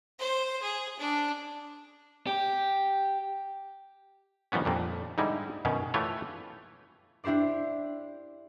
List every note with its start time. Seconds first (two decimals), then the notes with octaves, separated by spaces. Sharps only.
0.19 C5
0.62 G#4
0.99 D4
2.27 G4
4.52 D#3 F3 G3 B3 C#4
4.65 F2 A#2 G3
5.18 G#2 D3 G3 D#4 E4
5.65 F#2 B2 D#3 C#4
5.94 E3 A3 F4 G4 B4 C#5
7.24 D4 E4 G4 C5 D5